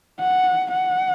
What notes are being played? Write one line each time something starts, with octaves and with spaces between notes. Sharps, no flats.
F#5
F#5